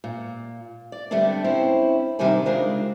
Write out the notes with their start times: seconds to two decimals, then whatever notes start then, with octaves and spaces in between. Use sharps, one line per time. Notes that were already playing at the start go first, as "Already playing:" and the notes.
0.04 A#2
0.92 D5
1.11 D3 G3 A3 B3 C4 D4
1.44 C4 C#4 E4 C5
2.19 C3 D#3 G3 D4 C5 G#5
2.45 C#3 G#3 D4 F4 A#4 C5